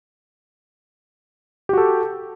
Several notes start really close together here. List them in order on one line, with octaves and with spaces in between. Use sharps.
G4 F#4 A4